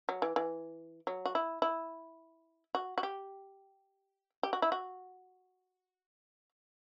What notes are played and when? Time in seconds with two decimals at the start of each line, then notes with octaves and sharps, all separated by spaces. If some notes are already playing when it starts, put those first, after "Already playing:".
0.09 F#3
0.22 E3
0.36 E3
1.07 F#3
1.25 F#4
1.35 E4
1.62 E4
2.75 F#4
2.98 F#4
3.03 G4
4.43 G4
4.53 F#4
4.62 E4
4.72 F#4